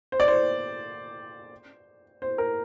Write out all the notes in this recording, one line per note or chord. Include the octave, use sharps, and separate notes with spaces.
C5
D5
C5
C5
A#4